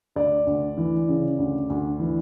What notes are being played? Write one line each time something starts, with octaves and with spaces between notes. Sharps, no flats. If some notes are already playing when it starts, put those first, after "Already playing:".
D2 D5
D2
E3
C#3
D2
D2
E3